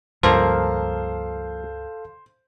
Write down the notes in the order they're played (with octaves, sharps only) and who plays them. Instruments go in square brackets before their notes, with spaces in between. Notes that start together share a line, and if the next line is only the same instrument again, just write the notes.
[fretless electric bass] C#2 G2 [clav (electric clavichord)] F3 A#3 A#4 [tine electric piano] A4 F5 [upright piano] C5